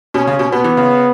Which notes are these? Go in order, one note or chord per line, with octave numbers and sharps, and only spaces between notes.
B2 C#4
C#3
B2
B2 B3
E3
C#3